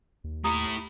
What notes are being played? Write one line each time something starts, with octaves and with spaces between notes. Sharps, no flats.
D#2
A2 E4 G4 A#5 D#6